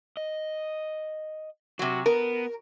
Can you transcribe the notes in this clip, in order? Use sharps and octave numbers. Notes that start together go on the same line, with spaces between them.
D#5
C3 F#3 F#4
B3 A#4